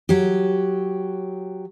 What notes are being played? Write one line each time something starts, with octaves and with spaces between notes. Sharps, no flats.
F#3 G4